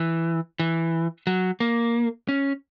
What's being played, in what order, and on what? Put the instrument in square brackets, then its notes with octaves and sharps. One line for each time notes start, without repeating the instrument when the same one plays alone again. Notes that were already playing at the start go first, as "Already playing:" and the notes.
Already playing: [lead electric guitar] E3
E3
F#3
A#3
C#4